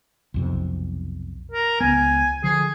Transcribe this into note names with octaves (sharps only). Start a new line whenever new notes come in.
B1 F2 C3
A#4
C#2 B3 G#5
D3 F3 G#4